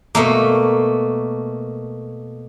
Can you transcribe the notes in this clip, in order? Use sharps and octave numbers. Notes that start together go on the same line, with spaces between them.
B2 A3 A#3